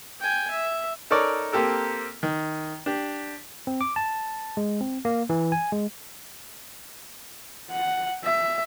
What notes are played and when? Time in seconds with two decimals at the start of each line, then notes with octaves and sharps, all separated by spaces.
0.20 G5 G#5
0.50 E5
1.10 D#4 A4 A#4 C#5 D5
1.52 A#3 C4 G4 A4 A#4
2.23 D#3
2.86 D4 G4
3.67 C4
3.81 D6
3.96 A5
4.57 G#3
4.81 C4
5.05 A#3
5.30 E3
5.52 G#5
5.72 G#3
7.71 F#5
8.24 E5